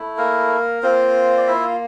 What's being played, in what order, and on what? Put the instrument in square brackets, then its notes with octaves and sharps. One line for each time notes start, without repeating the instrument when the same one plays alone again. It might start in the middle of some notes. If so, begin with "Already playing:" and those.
Already playing: [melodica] A3 E4
A#3 A#4
A#3 C4 F4 C5
D5
E4 E5